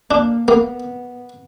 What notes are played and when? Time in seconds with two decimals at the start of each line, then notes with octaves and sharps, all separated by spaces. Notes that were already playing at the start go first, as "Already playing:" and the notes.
0.11 A#3 D4
0.48 A#3 B3